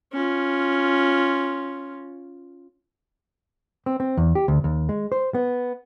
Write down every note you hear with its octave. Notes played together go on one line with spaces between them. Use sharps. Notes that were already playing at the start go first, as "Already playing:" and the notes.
C#4 F4
C4
C4
E2
G4
D2
D#2
G#3
C5
B3